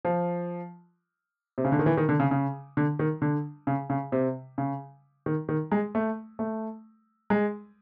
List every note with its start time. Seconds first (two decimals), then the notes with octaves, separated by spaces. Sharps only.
0.05 F3
1.58 C3
1.65 C#3
1.72 D3
1.79 D#3
1.86 E3
1.97 D#3
2.09 D3
2.20 C#3
2.31 C#3
2.77 D3
2.99 D#3
3.22 D3
3.67 C#3
3.90 C#3
4.12 C3
4.58 C#3
5.26 D#3
5.49 D#3
5.72 G#3
5.95 A3
6.39 A3
7.30 G#3